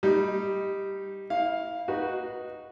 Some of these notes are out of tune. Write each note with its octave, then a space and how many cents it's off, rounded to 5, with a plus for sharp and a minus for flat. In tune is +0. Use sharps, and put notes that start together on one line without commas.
G3 +0 D#4 +0
E4 -30 F5 +5
D#4 +0 F#4 +0 B4 -15